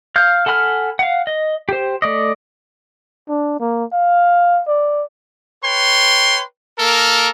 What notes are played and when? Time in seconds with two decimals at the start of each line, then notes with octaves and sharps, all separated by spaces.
0.16 F5 F6 G6
0.46 A4 F#5 G#5 B5 F6
0.99 F5 F#5
1.27 D#5
1.69 G4 C5
2.02 A3 D5 D#5
3.29 D4
3.60 A#3
3.93 F5
4.67 D5
5.63 B4 C#5 G5 C6
6.78 A#3 A4 A#4